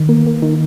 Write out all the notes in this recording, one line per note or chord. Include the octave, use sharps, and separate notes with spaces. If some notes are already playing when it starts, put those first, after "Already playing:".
Already playing: D#3
A#3
A#3
D#3